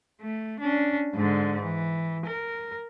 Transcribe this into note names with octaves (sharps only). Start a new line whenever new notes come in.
A3
C#4 D4
G#2 D3
E3
A#4